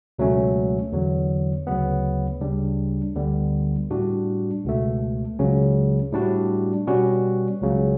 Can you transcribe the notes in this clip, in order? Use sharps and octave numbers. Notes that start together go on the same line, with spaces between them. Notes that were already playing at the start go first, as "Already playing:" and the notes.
C#2 B2 F#3 A3 C#4
E2 D3 F#3
D2 C#3 F#3 B3
D2 C#3 G3 D4
D2 D3 G3 B3
A2 G3 D4 F#4
C#2 B2 A3
C#2 C#3 F#3 C#4
A2 G3 D4 F#4
B2 G3 C#4 F#4
C#2 C#3 F#3